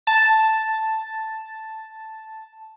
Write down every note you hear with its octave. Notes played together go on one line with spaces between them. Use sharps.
A5 A6